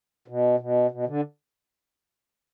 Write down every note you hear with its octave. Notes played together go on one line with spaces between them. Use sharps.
B2
B2
B2
D3